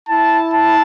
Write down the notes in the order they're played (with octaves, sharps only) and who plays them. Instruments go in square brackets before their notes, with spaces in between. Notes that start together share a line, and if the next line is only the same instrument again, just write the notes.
[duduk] E4 [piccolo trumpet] A5
[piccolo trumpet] A5